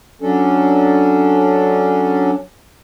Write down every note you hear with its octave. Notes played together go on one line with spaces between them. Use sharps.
F#3 C#4 D4 A4